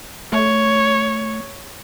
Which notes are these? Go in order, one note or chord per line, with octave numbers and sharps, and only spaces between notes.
A3 C#5